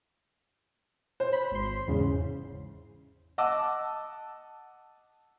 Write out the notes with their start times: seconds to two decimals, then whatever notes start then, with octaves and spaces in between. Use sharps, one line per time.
1.20 C5
1.33 B5
1.51 G#1 C6
1.88 E2 G#2 C#3
3.38 D#5 F#5 A5 D6 E6